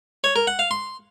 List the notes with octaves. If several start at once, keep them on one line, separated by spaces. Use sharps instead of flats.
C#5
A#4
F#5
F5
C6